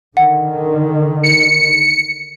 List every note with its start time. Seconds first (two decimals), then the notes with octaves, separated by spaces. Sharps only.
0.17 D3 D#3 F#5
1.23 C#7